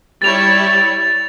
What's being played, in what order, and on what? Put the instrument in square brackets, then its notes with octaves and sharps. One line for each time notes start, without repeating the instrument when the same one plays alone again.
[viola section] G3 E4 C#5 [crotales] A6 F7